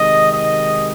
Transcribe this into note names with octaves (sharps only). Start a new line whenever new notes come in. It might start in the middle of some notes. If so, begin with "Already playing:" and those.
Already playing: C3 D#3 G#3 D#5
D#5